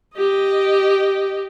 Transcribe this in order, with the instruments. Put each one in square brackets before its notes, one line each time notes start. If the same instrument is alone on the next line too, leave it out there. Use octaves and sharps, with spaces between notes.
[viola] G4 D#5